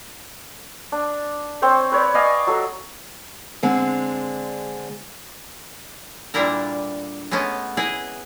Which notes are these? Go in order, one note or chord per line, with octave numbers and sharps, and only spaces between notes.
D4
C4 C5 C#5 G5
B4 C#5 D5
D5 D#5 F5 G#5
F#3 A4
D3 G#3 C4 D4
A#2 D3 G3 D4 E4 A#4
G#3 A3 B3 C#4 A4
E4 G#4 B4 D#5